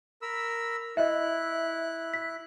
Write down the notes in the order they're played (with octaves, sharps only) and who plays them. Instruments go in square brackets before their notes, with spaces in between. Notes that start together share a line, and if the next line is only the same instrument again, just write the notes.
[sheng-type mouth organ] A#4 B5 E6
[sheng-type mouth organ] E4 F#6 [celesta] D#5 E5
[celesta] B6